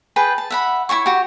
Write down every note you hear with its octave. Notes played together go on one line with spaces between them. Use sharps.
G#4 B4 G5 A5
A5
E5 F#5 B5
E4 F#4 C#5 C#6
F#4 G4